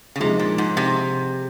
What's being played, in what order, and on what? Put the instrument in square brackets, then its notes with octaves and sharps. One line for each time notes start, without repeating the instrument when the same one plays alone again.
[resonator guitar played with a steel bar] C#3
[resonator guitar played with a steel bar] C3 [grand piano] F3 G#3 D#4
[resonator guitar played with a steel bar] A#2
G#2
C3